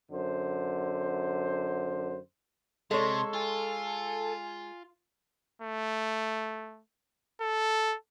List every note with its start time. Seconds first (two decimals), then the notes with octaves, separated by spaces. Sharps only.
0.12 F#2 D3 C5
2.91 C3 G#3 A4 C#5 C6
3.33 F4 G#5
5.62 A3
7.41 A4